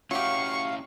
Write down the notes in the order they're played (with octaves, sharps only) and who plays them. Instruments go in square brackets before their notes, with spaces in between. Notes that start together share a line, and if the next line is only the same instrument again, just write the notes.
[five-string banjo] F#3 G4 [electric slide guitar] C#4 E4 [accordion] F5 [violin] C#6